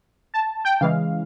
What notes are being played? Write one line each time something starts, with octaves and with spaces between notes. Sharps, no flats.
A5
G5
C#3 E3 G#3 F5